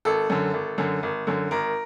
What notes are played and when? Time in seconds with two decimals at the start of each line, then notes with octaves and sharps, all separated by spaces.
0.05 G#1 A4
0.30 F#2 D3
0.54 G#1
0.78 F#2 D3
1.03 G#1
1.27 F#2 D3
1.51 G#1 A#4